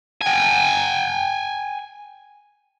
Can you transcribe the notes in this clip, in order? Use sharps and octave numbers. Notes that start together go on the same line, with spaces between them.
G5 G#5